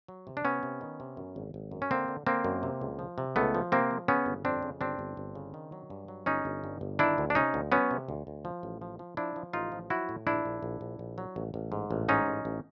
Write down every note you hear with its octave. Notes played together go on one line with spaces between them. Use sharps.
F#3
C3
D4
C3 B3 C#4
C3
D#3
C3
F#2
G#1
G#1
F#2
C#4
D3 A#3 C4
D3
D3 A#3 C4
F#2
C3
C#2
F3
C3
C#2 A3 B3
F3
C3 A#3 C4
F3
C#3 B3 C#4
G1
F2 C4 D4
C#3
G1 C4 D4
G1
G1
C#3
D#3
F#3
G2
F#3
G1 C#4 D#4
G1
G2
G1
D#3 D4 E4
D2
D4
C3 C#4 D#4
D2
F#3 B3 C#4
C3
D2
D2
F3
A1
F3
F3
F3 D4 E4
F3
A1 D#4 F4
F3
F#3 E4 F#4
A2
A#1 D4 E4
A#1
A#1
A#1
A#1
F#3
A1
A1
G#2
A1
G#2 C#4 D#4
A1
A1